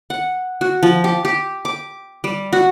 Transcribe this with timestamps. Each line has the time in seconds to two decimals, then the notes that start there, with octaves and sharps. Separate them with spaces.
0.10 F#5
0.61 F#4
0.83 F3
1.04 G4
1.25 G4
1.65 D6
2.24 G3
2.53 F#4